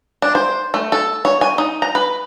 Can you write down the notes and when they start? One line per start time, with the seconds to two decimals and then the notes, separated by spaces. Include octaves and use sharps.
0.22 D4
0.35 C5
0.74 A3
0.92 A4
1.25 C#5
1.41 G#5
1.58 D#4
1.82 A#5
1.95 B4